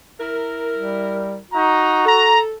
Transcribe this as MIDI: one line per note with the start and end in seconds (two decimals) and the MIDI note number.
0.19 1.44 64
0.19 1.44 70
0.76 1.39 55
1.52 2.03 63
1.52 2.36 66
1.52 2.03 82
2.06 2.55 69
2.06 2.38 82